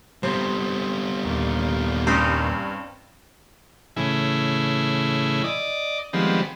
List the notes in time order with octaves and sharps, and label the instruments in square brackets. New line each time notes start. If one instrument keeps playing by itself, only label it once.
[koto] C3 [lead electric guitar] G3 B3 [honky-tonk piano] C5
[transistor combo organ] D#2 A#2
[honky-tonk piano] G2 [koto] C4 C#4 D#4
[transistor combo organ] A2 C#3 E3 E4 G#4
D5 D#5
D#3 F3 G3 G#3 B3 C4